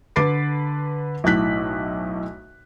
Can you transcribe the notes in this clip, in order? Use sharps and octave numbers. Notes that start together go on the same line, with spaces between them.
D3 B4 D6 A6 C7 D7
B1 A2 A5 F#6 B6